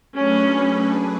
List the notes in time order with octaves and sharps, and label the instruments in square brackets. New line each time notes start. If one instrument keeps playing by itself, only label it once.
[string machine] F#3 A3 D4 G#4 B4 [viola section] C#4